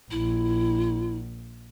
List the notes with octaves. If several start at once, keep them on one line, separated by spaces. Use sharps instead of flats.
A#1 E4